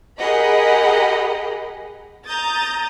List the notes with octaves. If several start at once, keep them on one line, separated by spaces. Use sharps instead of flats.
G4 G#4 A#4 D#5 F#5 B5
A#5 D#6 G6 A6